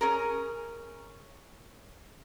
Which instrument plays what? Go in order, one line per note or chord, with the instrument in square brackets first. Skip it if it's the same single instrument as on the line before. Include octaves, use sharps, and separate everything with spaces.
[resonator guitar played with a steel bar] C#4 G#4 A#4